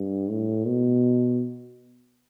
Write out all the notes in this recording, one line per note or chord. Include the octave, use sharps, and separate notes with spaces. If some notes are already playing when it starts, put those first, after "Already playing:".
Already playing: G2
A2
B2